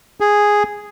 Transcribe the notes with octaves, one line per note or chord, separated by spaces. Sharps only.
G#4